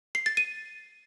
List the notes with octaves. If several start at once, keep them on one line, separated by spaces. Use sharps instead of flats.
C7
A6
D#7